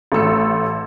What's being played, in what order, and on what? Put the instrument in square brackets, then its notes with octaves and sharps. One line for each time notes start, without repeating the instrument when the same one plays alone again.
[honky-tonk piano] A1 A3 E6 C#7